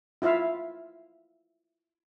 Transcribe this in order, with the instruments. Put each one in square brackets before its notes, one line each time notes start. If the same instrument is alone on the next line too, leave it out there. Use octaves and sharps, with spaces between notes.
[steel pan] E4 F4 E5 F5